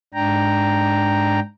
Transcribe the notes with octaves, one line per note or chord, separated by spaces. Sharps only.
G#2 D4 G5 A#5